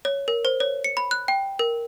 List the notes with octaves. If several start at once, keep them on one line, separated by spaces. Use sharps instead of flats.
C#5
A#4
C5
C#5
C#7
B5
F#6
G5
A#4